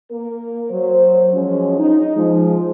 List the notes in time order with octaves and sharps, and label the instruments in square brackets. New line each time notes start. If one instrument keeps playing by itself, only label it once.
[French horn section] A#3 A#4
F#3 C5
F3 F#3 G#3 C#4
D#4
F3 G#3